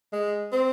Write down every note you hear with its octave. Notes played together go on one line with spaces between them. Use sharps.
G#3
C4